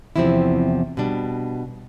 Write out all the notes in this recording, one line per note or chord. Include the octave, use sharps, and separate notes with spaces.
E2 C3 F3 C4 E4
B2 G3 D4